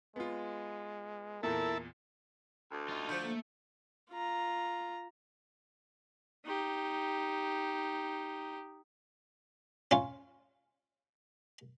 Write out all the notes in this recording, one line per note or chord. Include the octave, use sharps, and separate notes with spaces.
G#3 B3 F4
E2 A#2 E4 A4 A#4 A5
D2
D#4 F4
D3 F3 A3 G6
A#3
F4 A#5
D#4 G4
C#4 F4